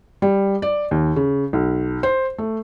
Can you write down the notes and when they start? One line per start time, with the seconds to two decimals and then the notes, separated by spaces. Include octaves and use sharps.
0.22 G3
0.62 D5
0.91 D#2
1.16 C#3
1.53 B1
2.03 C5
2.38 A3